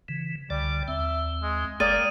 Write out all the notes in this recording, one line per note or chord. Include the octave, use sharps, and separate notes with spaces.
C#3 E3
C#2 D3 G3 D5
D#2 C4 E5
G#3
G1 G#3 A#3 D5 G5 D#6 D#7